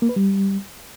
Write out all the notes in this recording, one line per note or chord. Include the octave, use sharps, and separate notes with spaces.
A#3
B4
G3